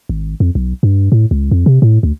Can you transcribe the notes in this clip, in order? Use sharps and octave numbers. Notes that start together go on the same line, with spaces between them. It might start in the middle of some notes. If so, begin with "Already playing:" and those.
G#1
F2
B1
G2
A2
C#2
F2
C3
A2
D2